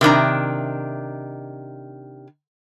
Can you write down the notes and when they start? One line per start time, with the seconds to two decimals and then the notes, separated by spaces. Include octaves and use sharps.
0.01 C3 D#3 D4 A#5